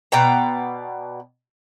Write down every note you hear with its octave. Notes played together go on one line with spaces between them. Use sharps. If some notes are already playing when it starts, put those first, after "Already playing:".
B2 D5 G5 A#5